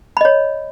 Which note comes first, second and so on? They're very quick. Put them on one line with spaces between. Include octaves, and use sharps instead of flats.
B5 D#5 C#5